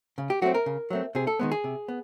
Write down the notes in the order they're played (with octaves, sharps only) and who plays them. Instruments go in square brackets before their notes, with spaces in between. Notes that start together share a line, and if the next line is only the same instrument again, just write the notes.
[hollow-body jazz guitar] C#3
G4
F#3 A3 C4 F#4
A#4
C#3
F#3 A3 C4
C3 G#4
A4
D#3 G#3 B3
G#4
C3
B3